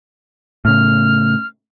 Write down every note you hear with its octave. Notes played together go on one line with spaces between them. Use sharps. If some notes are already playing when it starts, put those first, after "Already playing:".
A2 C#3 F6